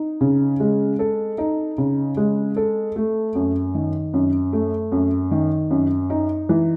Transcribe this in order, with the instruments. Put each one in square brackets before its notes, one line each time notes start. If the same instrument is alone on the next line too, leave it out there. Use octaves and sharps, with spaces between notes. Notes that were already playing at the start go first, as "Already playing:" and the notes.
Already playing: [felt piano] D#4
C#3
G#3
A4
D#4
C#3
G#3
A4
A3
F#2
D#3
F#2
A3
F#2
D#3
F#2
D#4
E3